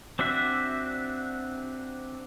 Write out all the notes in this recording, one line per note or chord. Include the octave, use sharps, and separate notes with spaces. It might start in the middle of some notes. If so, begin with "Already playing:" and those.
C4 D4 F#4 E5